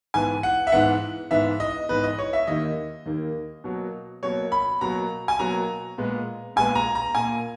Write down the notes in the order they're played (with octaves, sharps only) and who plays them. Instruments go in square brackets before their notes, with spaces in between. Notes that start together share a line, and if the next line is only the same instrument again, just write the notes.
[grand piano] G#2 E3 B3 G#5
F#5
E5
G#2 E3 B3 F#5
G#2 E3 B3 E5
D#5
G#2 E3 B3 B4
D#5
C#5
E5
D#2 D#3 A#3 D#5
D#2 D#3 A#3
B2 F#3 A#3
B2 F#3 A#3 C#5
B5
B2 F#3 A#3 A#5
G#5
B2 F#3 A#3 A#5
A#2 G#3 B3
A#2 G#3 B3 G#5
A#5
A#5
A#2 A#3 G#5